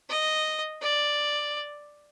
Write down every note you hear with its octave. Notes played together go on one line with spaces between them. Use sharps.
D#5
D5